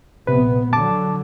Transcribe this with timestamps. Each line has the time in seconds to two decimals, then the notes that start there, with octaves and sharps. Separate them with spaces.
0.27 A#1 C3 B3 B4
0.73 D3 F#3 A5 D6